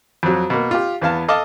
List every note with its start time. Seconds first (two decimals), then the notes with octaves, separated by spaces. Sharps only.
0.23 F2 F#3
0.50 B2 A#3
0.71 F4 G4
1.02 E2 B3 F5 A5
1.28 A4 D#5 F5 A5 D6